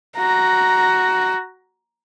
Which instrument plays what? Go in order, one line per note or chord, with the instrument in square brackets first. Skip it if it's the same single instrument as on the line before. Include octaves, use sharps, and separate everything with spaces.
[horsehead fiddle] F#4 A#5